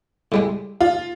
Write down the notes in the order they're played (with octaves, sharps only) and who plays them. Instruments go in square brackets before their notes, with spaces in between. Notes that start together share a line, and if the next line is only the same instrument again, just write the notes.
[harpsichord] A2 G3 G#3
[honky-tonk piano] F4